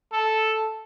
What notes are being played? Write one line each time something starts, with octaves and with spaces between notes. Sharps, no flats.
A4